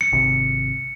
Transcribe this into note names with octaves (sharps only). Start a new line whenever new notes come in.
C#7
G#1 C3